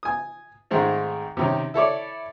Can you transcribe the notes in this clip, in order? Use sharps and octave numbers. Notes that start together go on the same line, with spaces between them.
G#5 D#6
G#2 D#3 G#3 A3 C4
C3 D#3 C#4
E4 A4 C#5 D5